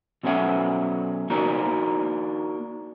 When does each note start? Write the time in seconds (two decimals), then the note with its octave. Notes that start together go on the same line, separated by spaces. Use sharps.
0.23 B2 F#3 C#4 A4 E5 F#5
1.30 A#3 D4 D#4 F#4 A#4